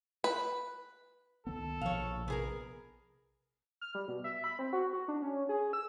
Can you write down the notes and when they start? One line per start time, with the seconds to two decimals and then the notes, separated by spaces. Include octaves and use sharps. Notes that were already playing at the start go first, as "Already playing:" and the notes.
0.24 B4
1.47 C#2 D#3 B3 A4
1.81 A#1 B2 F3 C#5 F5
2.28 C3 B3 G#4 A#4
3.81 F6
3.95 G3
4.08 B2
4.24 E5
4.44 B5
4.59 C4
4.73 F#4
4.93 F#4
5.08 D4
5.22 C#4
5.49 G#4
5.73 E6